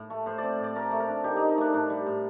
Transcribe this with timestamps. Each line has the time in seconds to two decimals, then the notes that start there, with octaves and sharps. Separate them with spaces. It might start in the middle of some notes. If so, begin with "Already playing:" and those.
Already playing: A2
0.10 A3
0.26 A2 C5
0.38 C4 D5
0.59 A2
0.64 D5
0.76 A3 A#4
0.91 A3
1.00 A#4
1.08 D4
1.24 D#3 G4
1.36 D#3 D#4
1.49 D#4
1.58 A3 D4
1.74 A2 D4
1.90 G3
2.06 A2